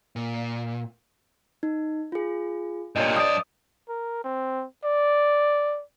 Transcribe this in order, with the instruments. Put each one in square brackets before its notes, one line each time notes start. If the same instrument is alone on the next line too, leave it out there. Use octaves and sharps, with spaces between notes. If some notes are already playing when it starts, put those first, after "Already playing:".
[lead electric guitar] A#2
[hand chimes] D#4
F4 G#4
[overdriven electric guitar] G2 A#2 [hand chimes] C#5 D#5
[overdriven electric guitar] G2 D5 [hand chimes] D#6
[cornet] A#4
C4
D5